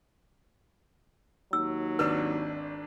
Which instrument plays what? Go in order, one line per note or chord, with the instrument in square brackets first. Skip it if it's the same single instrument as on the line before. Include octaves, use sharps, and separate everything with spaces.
[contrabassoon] D#2 [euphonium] F#3 [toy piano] E6
[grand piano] G#1 D4 E6 [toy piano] B4